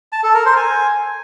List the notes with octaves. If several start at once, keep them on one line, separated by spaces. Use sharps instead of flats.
A5
A4
A#4
C5
G#5